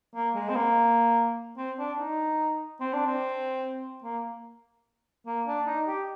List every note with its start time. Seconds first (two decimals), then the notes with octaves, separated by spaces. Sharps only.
0.15 A#3
0.35 G#3
0.49 C4
0.56 A#3
1.57 C4
1.78 D4
1.99 D#4
2.80 C4
2.93 D4
3.06 C4
4.04 A#3
5.26 A#3
5.47 D4
5.67 D#4
5.87 G4